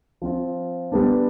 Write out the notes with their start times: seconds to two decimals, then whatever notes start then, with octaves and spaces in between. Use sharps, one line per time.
0.22 F3 C4 F4
0.92 G3 B3 D4